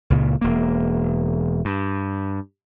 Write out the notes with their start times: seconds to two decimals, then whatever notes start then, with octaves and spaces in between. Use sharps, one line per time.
0.10 C#2 A#2 C#3
0.41 E1 A#3
1.65 G2